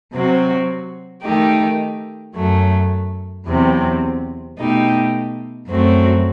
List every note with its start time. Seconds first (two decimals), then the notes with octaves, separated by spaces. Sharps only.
0.13 C3 F#3 C4 F#4
1.24 D#3 A3 D#4 G4
2.35 F#2 F#3 A3
3.46 E2 C3 F#3 C4
4.57 B2 A3 D#4 G4
5.67 F#2 F#3 A3 C4 F#4